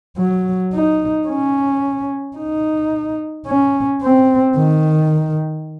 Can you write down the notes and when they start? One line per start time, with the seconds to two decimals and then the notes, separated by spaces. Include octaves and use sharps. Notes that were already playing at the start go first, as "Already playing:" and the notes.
0.17 F#3
0.73 D#4
1.28 C#4
2.37 D#4
3.47 C#4
4.02 C4
4.57 D#3